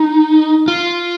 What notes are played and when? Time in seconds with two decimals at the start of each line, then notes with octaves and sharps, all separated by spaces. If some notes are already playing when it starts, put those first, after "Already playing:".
Already playing: D#4
0.68 F4